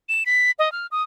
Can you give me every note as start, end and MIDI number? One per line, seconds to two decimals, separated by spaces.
0.09 0.24 100
0.26 0.51 95
0.59 0.71 75
0.72 0.87 89
0.91 1.03 87